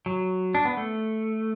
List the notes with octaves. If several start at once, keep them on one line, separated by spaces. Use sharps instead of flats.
F#3
D4
B3
A3